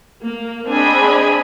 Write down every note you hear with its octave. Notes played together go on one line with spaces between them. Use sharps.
A#3
C4 D4 G#4 D#5 G#5 B5